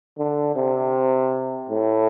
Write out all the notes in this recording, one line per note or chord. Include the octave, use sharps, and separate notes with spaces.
D3
C3
A2